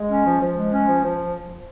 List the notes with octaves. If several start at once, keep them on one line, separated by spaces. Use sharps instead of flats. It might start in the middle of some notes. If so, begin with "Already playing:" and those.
Already playing: G#3
C#4
F3
F3
G#3
C#4
F3
F3